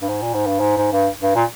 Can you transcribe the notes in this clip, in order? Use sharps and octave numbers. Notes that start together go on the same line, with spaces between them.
G2
G#2
A#2
G#2
G2
G#2
G#2
G2
G2
A#2